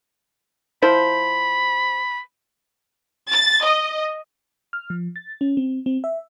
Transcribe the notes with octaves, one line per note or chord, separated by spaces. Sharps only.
F3 E4 C5 B5
A6
D#5
F6
F3
A6
C#4
C4
C4
E5